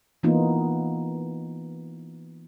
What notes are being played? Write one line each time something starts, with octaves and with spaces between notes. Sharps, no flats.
E3 A#3 B3 D#4 F4